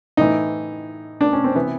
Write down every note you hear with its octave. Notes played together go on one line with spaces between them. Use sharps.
A2 E3 D#4
D4
C#4
C4
C3 E3 B3